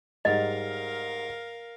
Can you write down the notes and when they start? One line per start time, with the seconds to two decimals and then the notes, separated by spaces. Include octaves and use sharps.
0.25 G#2 G3 A#4 D#5 F5